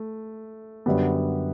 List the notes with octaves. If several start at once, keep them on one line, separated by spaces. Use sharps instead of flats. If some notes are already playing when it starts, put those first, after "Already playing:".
Already playing: A3
F#2 D3 G3 B3